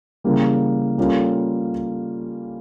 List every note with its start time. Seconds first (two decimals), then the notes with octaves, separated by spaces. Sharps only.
0.24 C#3 E3 G3 A#3
0.98 G3 A#3 C#4 F4 A4